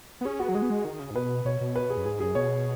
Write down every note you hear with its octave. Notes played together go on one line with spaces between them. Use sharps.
B3
C#4 G#4
B3 F#4
F#3
G#3 G#4
B3
G#3
D#3
C#3
G#2
B2 B4
B2 C#5
B2
B4
G#4
F#2
G#2 G#4
F#2 G#4
B2 C#5